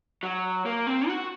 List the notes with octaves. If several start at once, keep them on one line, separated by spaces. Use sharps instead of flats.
F#3
A#3
C4
F#4